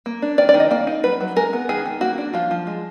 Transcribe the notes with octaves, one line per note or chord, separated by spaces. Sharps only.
A#3
D4
D#3 D5
D5
D#3
D#5
A#3 D5
D#4
F#3 B4
F#3
G#3 A#4
B3
D#3 G#4
D#3
A#3 F#4
D4
F3 F4
F3
G#3